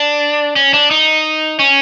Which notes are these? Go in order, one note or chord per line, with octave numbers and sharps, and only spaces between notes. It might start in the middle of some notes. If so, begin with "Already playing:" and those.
Already playing: D4
C#4
D4
D#4
C#4